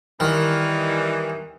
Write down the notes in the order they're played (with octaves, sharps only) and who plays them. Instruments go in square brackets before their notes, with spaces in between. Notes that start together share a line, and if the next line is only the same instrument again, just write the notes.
[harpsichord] D#3 [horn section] E3 G3 D#4